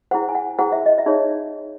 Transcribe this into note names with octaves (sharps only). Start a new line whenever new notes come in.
E4 G#4 C5 F#5
G#5
F#5
E4 G#4 C5 F#5
E5
D#5
E5
D#4 G#4 C#5